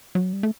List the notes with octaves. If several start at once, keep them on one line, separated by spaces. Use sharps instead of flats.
F#3
G3
A3